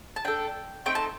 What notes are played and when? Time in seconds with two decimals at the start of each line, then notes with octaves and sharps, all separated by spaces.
0.16 A5
0.25 D4 A4 G5
0.86 A3 C4 D#4 G5
0.95 A5